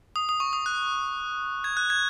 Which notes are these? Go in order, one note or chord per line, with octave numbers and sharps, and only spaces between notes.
D#6
D#6
C#6
D#6
F#6
G#6
F#6
G#6